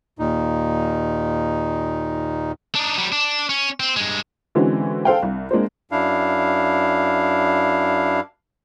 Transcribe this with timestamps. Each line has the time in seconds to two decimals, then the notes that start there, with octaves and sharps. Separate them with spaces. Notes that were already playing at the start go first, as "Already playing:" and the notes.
0.19 D#2 A#2 D#4
2.75 D4 D#4
2.98 F#3 G3
3.12 D4
3.49 C#4
3.80 C4
3.96 G2 G#3
4.55 D3 E3 G#3 C4 C#4 F#4
5.05 A4 C5 F5 G5
5.23 C2
5.51 G#3 A#3 D4 C5
5.91 F#2 D4 E4 F5